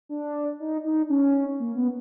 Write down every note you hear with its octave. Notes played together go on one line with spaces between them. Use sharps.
D4
D#4
D#4
C#4
A#3
B3